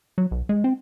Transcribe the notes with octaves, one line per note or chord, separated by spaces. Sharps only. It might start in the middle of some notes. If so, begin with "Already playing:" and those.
F#3
B1
G#3
C4